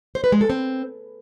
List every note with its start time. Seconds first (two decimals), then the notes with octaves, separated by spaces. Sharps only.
0.15 C5
0.24 B4
0.32 G#3
0.41 A4
0.50 C4